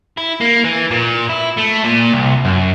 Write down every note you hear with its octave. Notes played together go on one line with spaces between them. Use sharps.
E4
A#3
E3
A#2
E4
A3
A#2
C2
F#2